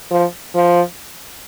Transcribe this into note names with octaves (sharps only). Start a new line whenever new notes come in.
F3
F3